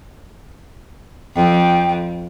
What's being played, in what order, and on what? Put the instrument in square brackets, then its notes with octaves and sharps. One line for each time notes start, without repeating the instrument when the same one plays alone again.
[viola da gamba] F2 [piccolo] G5